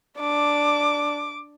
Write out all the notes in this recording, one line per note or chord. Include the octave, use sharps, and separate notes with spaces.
D4 D6